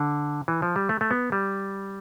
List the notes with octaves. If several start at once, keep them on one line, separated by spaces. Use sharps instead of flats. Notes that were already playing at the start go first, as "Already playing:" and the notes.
Already playing: D3
E3
F3
G3
A3
A3
B3
G3